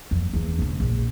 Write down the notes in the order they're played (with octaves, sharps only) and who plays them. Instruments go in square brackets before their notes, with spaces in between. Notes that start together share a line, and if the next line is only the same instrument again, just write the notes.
[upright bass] F2
E2 D4
E1 C#3
A#1